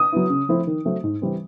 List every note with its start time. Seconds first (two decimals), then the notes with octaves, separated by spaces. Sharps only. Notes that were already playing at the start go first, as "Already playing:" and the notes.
Already playing: D#6
0.12 F#3 B3 E4
0.30 C#3
0.49 F3 A3 C4 E4
0.67 D#3
0.85 F#3 A3 C4
1.04 G#2
1.22 E3 G3 C4